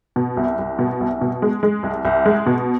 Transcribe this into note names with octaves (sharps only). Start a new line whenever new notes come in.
B2
C2
C2
B2
C2
B2
G#3
G#3
C2
C2
G#3
B2